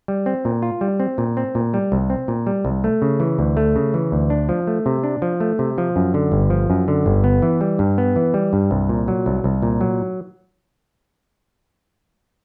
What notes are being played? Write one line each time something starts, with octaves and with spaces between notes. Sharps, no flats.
G3
C4
A#2
F4
G3
C4
A#2
C4
A#2
G3
C2
C4
A#2
G3
C2
A3
C#3
E3
D2
A3
C#3
E3
D2
D4
F3
A3
C3
D4
F3
A3
C3
F3
F#2
D3
G1
F3
F#2
D3
G1
B3
E3
G3
G2
B3
E3
G3
G2
C2
A#2
F#3
C2
C2
A#2
F#3